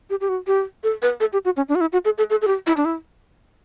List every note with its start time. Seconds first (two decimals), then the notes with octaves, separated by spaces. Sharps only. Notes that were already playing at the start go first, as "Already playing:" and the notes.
0.10 G4
0.21 G4
0.29 F#4
0.47 G4
0.84 A4
1.02 B4
1.20 A4
1.33 G4
1.45 F#4
1.57 C#4
1.69 D4
1.75 F#4
1.81 E4
1.93 F#4
2.05 A4
2.18 A4
2.30 A4
2.42 A4
2.47 G4
2.67 E4
2.77 D4
2.85 E4